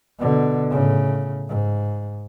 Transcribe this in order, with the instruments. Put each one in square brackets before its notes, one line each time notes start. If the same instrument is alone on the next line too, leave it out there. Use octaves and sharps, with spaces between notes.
[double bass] B2 D3
A2 C#3
G#2